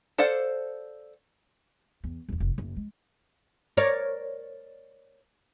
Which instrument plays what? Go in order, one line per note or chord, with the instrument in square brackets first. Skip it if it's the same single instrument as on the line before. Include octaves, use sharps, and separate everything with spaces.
[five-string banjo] A4 C5 D5 F5 F#5
[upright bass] E2
G#1 E2
F1
F#1
G#3
[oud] A#4 C#5 D5